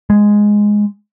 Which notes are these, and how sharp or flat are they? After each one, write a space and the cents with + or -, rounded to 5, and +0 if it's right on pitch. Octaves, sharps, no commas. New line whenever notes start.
G#3 -5